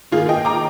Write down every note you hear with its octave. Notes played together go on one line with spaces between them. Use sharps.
D#3 A#3 F4 G#4
D#5 G5
A#5 D6